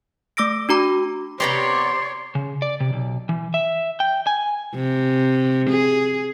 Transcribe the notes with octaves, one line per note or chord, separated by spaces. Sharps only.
A3 D6 E6 A#6 D7
D4 F#4 A#5 D6
C3 B3 G4 C#5 D5 A#5 C6
C#3
D5
C3
B1
E3
E5
G5
G#5
C3
G#4